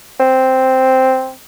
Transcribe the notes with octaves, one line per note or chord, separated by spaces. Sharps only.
C4